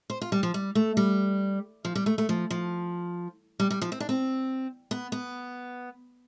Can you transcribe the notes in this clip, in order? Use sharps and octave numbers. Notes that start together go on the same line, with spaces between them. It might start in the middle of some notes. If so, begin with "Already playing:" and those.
C5
F4
G3
F3
G3
A3
G3
F3
G3
A3
A3
F3
F3
G3
G3
F3
C4
D4
C4
B3
B3